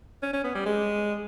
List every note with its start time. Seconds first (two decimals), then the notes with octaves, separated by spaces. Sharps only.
0.22 C#4
0.33 C#4
0.44 B3
0.55 G3
0.66 G#3